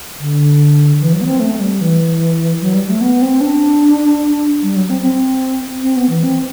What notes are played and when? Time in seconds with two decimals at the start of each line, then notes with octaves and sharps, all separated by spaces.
0.20 D3
1.01 E3
1.13 F#3
1.21 B3
1.26 C4
1.40 A3
1.60 G3
1.81 E3
2.61 F#3
2.74 G3
2.88 A3
3.01 B3
3.22 C4
3.41 D4
4.62 G3
4.76 F#3
4.90 C4
5.02 C4
5.82 C4
5.97 B3
6.09 E3
6.23 C4